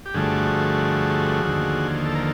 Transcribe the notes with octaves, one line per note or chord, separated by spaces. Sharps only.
G4
G2 D3 F3 A3 F#4 G#4
D#2 D3 F3
A4
A#4